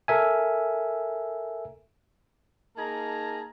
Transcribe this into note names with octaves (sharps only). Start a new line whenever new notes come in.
A4 A#4 E5 G#5
A#3 D#4 G#4 A5 A#5